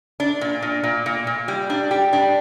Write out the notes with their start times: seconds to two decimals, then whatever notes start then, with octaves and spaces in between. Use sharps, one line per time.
0.20 D4
0.41 A#2
0.62 A#2
0.83 A#2
1.06 A#2
1.27 A#2
1.48 G3
1.70 D4
1.91 G4
2.13 D4